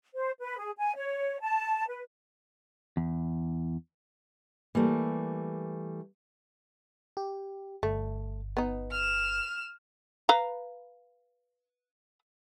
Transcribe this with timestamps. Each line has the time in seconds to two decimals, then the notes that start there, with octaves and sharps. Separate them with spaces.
0.15 C5
0.40 B4
0.58 G#4
0.77 G#5
0.95 C#5
1.40 A5
1.87 B4
2.97 E2
4.75 E3 G3 A3 A#3
7.17 G4
7.83 G1 A3
8.57 B3 D#4
8.91 F6 E7
10.29 B4 F5 A#5